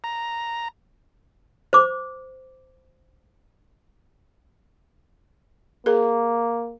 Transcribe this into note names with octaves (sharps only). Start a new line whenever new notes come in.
A#5
C5 D6
A#3 G#4 A#4